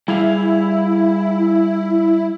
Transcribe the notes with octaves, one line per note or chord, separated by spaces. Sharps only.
G3 E4 G#4 F5